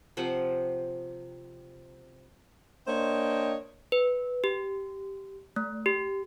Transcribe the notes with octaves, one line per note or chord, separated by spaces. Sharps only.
C3 F3 C5 F#5
A#3 D4 C5 C#5 D#5 G5
B4
G4
A3
G4